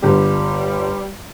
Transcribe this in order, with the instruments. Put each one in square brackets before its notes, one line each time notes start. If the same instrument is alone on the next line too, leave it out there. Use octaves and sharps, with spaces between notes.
[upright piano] G1 G4 [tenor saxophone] G3